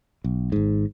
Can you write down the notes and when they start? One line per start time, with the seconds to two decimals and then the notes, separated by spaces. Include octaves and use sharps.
0.24 B1
0.52 G#1 G#2